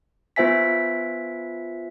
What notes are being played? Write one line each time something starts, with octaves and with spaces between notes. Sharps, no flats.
B3 F4 C5 E5 G#5 B6